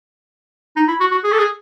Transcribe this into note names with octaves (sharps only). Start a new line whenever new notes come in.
D#4
E4
F#4
F#4
G#4
A4
G#4